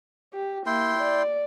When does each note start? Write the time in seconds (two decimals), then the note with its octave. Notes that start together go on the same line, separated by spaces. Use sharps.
0.34 G4
0.66 A#3 E4 G5 C6
0.98 D5